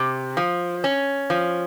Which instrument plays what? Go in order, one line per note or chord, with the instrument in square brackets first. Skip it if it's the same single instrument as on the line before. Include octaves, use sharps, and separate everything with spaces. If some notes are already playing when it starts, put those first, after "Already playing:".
Already playing: [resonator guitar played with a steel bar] C3
F3
C#4
F3